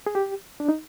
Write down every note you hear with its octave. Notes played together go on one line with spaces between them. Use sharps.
G#4
G4
D4
D#4